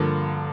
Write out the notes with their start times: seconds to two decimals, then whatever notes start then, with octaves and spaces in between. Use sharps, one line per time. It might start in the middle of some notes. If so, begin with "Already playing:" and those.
Already playing: G2 D3 F3 A#3